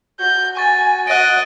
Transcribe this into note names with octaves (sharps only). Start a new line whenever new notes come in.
F#4 G6
G#5 C#6 A6
D#5 F#5 F#6 D7